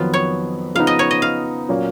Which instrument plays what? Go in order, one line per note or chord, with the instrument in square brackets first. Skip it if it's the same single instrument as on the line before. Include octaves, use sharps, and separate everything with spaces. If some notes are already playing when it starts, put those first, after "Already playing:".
Already playing: [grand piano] F2 D#3 F#3 B3 [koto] F4
[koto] C#5
[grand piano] C#3 F3 B3 D#4 [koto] F5
[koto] D#5
C#5
D#5
F5
[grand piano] A#2 F#3 A#3 C#4